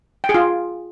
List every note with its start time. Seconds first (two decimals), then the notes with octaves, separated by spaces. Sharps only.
0.24 G5
0.29 G#4
0.34 F4